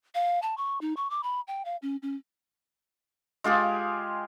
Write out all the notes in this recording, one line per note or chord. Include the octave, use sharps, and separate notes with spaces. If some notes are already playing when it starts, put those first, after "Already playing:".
F5
A5
C#6
D#4
C#6
D6
B5
G5
F5
C#4
C#4
G#3 F4 G4 G#4